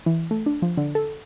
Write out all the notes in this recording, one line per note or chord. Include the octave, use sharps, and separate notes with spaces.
E3
A3
D4
F3
D3
A4